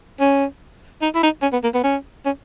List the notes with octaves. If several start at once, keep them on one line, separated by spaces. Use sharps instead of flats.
C#4
D#4
E4
D#4
C#4
B3
A#3
B3
C#4
C#4